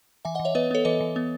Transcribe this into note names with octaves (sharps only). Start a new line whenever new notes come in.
E3 E5 G#5
D#5 F#5
E3
C#5 E5
B3 B4 D#5
B3 A4 C#5
E3 B4 D#5
E3
B3